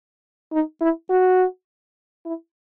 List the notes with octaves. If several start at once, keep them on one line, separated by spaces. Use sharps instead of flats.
D#4
E4
F#4
E4